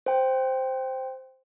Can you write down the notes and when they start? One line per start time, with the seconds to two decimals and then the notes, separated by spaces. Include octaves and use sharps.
0.06 C5 G5